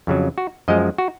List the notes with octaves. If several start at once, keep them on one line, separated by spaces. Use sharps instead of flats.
F2 C#3 F#3
F#4
F#2 F3 G#3 D#5
F#4